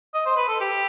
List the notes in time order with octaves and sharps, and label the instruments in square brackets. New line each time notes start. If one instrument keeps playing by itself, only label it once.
[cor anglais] D#5
C5
B4
A4
G4